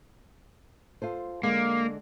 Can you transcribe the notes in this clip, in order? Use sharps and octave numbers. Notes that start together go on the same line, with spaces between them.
F4 A4 C5
D3 G#3 A#3